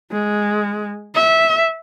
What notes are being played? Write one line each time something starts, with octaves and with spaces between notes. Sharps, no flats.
G#3
E5